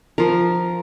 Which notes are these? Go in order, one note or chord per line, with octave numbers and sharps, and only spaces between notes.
F3 A#4